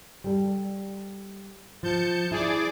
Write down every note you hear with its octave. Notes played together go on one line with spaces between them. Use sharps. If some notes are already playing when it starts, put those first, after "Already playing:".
G3 A4
F3 A5 G6 C#7
E4 G#4 D5 D6